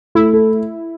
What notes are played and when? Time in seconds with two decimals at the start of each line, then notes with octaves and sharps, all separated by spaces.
0.15 A3 E4
0.33 A4